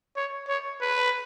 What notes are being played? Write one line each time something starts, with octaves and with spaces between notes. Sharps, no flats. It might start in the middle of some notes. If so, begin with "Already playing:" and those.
C#5
C#5
B4